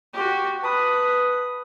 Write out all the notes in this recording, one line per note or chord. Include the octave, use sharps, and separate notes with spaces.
F#4 G4
B4 A5 B5 D#6 F#6